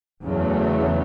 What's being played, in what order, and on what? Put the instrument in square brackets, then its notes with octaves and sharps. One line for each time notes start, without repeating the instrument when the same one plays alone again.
[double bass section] E2 C#3 F#3 A3